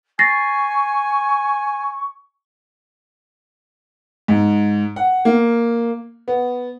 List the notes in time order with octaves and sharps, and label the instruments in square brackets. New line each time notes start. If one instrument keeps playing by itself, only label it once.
[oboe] G#5 [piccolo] C#6 [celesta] A6 A#6 C7
[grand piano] G#2
F#5
A#3
B3